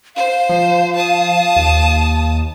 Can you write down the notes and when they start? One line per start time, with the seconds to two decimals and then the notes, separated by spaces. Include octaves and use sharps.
0.16 C5 F5
0.49 F3
0.95 A5 D#6
1.56 D#2